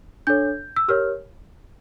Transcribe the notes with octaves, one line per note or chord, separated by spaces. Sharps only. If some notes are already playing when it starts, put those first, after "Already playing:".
D4 A4 C#5 G6
E6
G4 A#4 C#5 F6